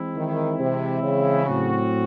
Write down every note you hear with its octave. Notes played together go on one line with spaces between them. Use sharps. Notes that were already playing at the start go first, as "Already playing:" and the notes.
Already playing: E3 G#3 C4 E4
D#3
C3
C#3
A2 F#3 C4 F#4